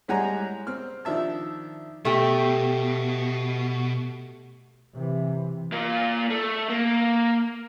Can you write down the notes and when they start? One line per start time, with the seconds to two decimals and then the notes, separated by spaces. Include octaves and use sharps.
0.08 A2 G3 G#3 F#5 G#5 A#5
0.67 C4 F6
1.05 D#3 F3 D4 E5 A5
2.05 B2 A3 G4
4.95 C3 E3
5.72 A#3 F4
6.30 A3
6.69 A#3